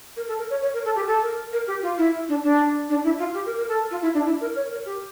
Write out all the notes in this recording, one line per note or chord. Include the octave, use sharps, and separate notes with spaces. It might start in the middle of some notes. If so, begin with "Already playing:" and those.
A#4
A4
A#4
C#5
C#5
A#4
A4
G4
A4
A#4
A#4
G4
F4
E4
D4
D4
D4
E4
F4
G4
A#4
A#4
A4
F4
E4
D4
E4
A#4
C#5
A#4
G4